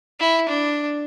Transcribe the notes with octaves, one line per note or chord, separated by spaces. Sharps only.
E4
D4